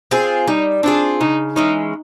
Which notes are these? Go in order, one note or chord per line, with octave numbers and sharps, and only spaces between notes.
C4 F4 G#4
G3 D#4
C4 D4 F4 G#4
C#3 D#4
E3 G#3 C#4 D#4